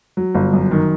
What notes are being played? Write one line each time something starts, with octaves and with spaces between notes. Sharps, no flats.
F#3
G1
F#2
D#3